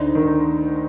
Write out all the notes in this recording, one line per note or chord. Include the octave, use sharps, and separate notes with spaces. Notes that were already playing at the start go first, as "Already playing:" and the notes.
Already playing: D2 D3 D4 D#4 D5
D#3